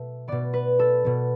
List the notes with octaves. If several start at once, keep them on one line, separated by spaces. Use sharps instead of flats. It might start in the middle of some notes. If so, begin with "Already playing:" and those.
Already playing: B2 A3
B2 B3 D5
B4
A4
B2 B3